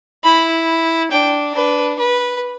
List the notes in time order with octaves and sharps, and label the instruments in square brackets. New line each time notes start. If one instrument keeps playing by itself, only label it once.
[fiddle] E4 [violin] B5
[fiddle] D4 [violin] G5
[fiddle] D4 [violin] B4
[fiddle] B4